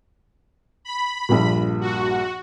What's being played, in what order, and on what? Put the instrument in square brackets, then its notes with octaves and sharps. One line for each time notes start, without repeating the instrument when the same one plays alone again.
[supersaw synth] B5
[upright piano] A#1 G2 A#2
[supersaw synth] F#4